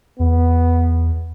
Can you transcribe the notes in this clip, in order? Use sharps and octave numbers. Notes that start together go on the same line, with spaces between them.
E2 B3